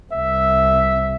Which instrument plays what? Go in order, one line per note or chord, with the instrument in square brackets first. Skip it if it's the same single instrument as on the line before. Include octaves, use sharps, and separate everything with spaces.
[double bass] C2 [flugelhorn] E5